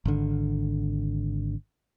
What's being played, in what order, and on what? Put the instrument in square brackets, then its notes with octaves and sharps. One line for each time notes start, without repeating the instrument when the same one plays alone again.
[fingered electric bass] G#1 D3